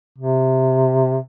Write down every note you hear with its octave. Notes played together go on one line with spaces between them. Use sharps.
C3